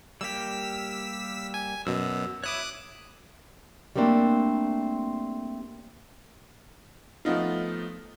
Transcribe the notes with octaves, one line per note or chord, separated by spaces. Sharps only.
G3 A#3 G4 E6 B6
G#5
F#2 B2 E6
E4 C#5 D6 D#6 F#6
G3 A3 A#3 C4 D4
F3 A3 B3 D#4 F4